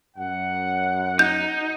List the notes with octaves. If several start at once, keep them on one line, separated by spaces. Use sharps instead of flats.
F#2 F#5
D#4 G6